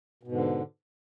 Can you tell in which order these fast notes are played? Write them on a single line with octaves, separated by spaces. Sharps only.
B2 G#2 D3